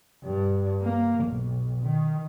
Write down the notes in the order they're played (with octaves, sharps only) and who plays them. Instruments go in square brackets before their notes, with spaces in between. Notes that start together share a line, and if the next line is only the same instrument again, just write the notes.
[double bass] G2
A#3
B1
D#3